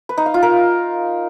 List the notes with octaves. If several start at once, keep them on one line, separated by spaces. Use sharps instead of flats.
B4
D#4
F5
F4
A#4